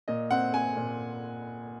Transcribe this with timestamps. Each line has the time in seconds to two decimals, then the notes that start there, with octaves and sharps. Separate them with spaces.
0.08 A#2 D#5
0.31 C4 F#5
0.54 C4 G#5
0.77 A#2